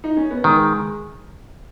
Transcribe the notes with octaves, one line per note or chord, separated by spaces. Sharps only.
D#4
C#4
B3
D#3 G#3